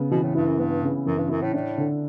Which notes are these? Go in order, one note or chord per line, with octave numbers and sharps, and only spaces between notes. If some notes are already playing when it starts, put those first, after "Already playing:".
Already playing: C#3 B3
B2 E3
A2
G2 E4
F#2
G2 B3
C#3
F#2 E3
G2
F#2 E4
A2
A2 D4
D3